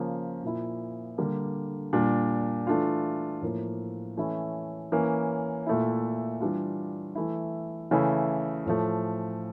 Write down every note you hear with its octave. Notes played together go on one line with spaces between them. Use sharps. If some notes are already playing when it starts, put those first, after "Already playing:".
Already playing: C#3 F3 A#3
A#2 F3 A#3 E4
D3 G3 A#3
A#2 G3 D4
E3 A3 D4 F4
A2 F3 A#3
E3 A3 C#4 E4
E3 A#3 C#4
A#2 A3 E4
E3 G3 D4 F4
E3 A3 E4
C#3 E3 A3 E4
A2 F3 A3